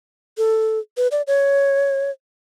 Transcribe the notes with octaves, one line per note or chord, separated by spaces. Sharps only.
A4
B4
D5
C#5